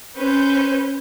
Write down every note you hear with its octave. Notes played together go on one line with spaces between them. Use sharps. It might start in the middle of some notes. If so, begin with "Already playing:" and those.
C#4 B4 C5 G6